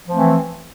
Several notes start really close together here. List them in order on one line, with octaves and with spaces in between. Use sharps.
F3 C4 A3 E3